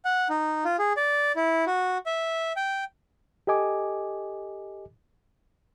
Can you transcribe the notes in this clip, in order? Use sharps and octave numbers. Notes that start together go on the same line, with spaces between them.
F#5
D#4
F4
G#4
D5
E4
F#4
E5
G5
G4 A4 D#5 G#5 D6